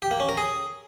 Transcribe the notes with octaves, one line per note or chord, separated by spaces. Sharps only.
G4
A#3
C#4
A#4
G#4